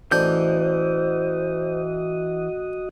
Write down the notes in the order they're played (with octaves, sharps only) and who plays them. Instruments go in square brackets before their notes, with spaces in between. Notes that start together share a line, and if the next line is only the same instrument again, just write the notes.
[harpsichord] A1 D4 G#5 [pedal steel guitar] E3 G6 [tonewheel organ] F#4 D#5 [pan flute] C5